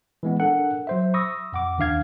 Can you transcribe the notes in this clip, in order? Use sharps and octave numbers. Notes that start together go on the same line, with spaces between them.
E3 G#3 B3
D4 A4 A#4 F#5
F#3 C5 E5
B5 C#6 D#6 E6 A#6
F2 F#5 D6
D#2 D#3 D4 F5 G#6